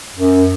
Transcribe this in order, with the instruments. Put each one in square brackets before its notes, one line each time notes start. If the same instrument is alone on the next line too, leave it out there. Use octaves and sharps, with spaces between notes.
[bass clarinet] F#2